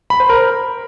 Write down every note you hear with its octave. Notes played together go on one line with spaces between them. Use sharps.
B5
C5
A#4